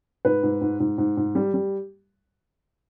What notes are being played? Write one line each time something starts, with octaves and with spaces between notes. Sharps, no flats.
G#2 B4
G#2
G#2
G#2
G#2
G#2
G3
G3